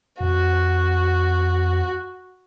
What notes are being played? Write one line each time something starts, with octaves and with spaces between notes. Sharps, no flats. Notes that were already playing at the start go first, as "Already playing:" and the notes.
F2 F#4